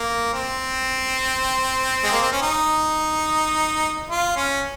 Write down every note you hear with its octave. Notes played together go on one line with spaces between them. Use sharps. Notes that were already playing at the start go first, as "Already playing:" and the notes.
Already playing: A#3
C4
G#3
A#3
C4
C#4
D#4
F4
C#4